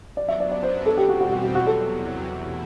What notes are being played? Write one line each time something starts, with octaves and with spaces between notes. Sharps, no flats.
F#2 F#3 B3 D4 D5
E5
D5
D5
C5
E2 B2 G3 C4 A4
G4
F#4
F#4
F#4
F#4
E2 C3 F#3 F#4
A4
E2 B2 A3 E4